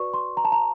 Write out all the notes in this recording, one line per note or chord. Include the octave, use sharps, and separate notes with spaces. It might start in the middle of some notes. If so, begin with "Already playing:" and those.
Already playing: F#4 B4 D5 C#6
C6
A#5
A5
A#5